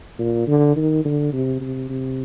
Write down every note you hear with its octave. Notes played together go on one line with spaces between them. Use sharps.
A#2
D3
D#3
D3
C3
C3
C3